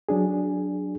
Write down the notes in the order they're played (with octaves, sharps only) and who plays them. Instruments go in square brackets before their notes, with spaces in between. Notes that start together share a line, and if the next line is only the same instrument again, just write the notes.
[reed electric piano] F#3 D4 G#4